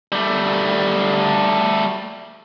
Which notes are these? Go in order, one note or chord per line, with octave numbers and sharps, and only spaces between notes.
G3 A3